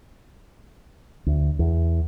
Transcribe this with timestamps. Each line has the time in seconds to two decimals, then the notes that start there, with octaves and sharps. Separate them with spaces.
1.26 D2
1.59 E2